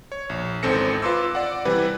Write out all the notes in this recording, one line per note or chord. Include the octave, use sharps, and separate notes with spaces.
C#5
A#1
G#1 E2 C4 A4 A#6 C#7
F4 B4 C6 D6 E6
D5 F#5
C3 E3 G3 B4